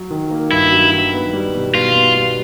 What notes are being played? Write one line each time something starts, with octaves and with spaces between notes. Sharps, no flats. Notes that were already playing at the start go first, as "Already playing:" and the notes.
Already playing: F#3
D#3
A#3
G2 E4
F#3
D#3
B3
G3
B2
B2 F4
B3
G3